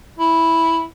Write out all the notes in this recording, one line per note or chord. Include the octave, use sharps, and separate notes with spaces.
E4